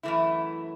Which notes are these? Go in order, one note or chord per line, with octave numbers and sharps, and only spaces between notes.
F#2 E3 A3 E4